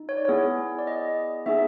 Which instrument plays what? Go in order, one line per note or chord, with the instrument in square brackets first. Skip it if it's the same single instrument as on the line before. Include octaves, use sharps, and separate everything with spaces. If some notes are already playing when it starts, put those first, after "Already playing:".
Already playing: [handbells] D#4
C#5
D5
B3 E4 G#4 C#5
D5
D#5
B3 D#4 G#4 E5